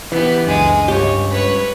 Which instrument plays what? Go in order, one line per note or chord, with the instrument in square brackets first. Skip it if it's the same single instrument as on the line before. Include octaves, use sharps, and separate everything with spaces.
[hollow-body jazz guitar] E3 [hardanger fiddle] B3 G4
[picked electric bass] C#2 F#2 D4 [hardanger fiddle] G#3 D#6
[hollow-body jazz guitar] C#2 G4 [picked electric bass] G2 [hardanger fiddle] C#5
[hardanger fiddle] B4 C#5